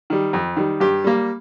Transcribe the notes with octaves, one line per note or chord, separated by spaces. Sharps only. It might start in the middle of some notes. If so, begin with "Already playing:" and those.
D#3 G3
F2
D#3 G3
G2 G4
G3 A#3